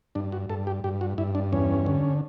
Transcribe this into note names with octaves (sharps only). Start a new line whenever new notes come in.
G2 D4
F#4
G2 A4
G4
G2 G4
F#4
G2 E4
D4
E2 C#4
D3